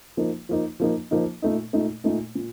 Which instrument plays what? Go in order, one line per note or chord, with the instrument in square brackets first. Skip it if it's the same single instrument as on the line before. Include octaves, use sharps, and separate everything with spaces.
[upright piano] F3 A#3 D#4
F3 A#3 D#4
F3 A#3 D#4
F3 A#3 D#4
A#2 A3 D#4
A#2 A3 D#4
A#2 A3 D#4
A#2